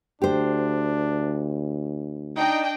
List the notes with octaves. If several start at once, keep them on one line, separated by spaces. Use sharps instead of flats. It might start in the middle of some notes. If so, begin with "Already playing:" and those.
D2 D4 G4 C5
D4 D#4 D#5 G5